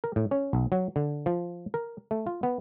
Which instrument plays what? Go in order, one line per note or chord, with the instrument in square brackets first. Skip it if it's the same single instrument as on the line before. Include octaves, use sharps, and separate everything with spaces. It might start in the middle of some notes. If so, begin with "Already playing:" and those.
[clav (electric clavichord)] A#4
A2
C#4
B1
F#3
D3
F3
A#4
A3
F4
B3